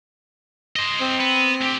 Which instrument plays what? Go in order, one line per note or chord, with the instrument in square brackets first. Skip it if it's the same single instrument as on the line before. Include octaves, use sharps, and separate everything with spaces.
[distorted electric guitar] C5 D#5
[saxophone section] C4
[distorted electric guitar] B3
D2 G4